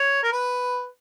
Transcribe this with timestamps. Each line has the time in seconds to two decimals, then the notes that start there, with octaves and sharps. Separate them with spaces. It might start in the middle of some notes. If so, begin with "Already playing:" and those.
Already playing: C#5
0.23 A#4
0.32 B4